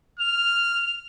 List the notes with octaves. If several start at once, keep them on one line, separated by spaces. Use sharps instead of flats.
F6 F7